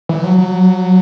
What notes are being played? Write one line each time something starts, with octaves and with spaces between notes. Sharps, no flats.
E3
F#3
F#3